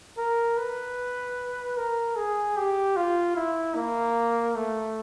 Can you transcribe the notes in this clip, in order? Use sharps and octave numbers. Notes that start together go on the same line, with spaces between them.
A#4
B4
A#4
G#4
G4
F4
E4
A#3
A3